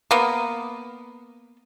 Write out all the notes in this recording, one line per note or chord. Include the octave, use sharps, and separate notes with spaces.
A#3 B3